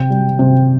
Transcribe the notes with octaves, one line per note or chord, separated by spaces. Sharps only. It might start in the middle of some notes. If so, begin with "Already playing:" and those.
Already playing: C3 G5
G3
C3